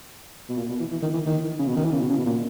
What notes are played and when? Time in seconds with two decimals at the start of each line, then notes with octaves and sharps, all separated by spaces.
0.49 B2
0.58 A#2
0.69 B2
0.80 E3
0.91 E3
1.02 D#3
1.13 E3
1.26 D#3
1.59 C#3
1.68 B2
1.77 D#3
1.85 E3
1.92 C#3
2.01 B2
2.09 C#3
2.18 B2
2.26 A#2